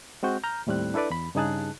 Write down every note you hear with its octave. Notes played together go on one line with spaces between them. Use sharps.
G#3 C4 F#4 G6
A#5 F6 G6
D#2 A2 G3 C4 F#6
D4 E4 A4 B4 D5
E2 B5
G2 C#3 D#4 G#4 A5 F#6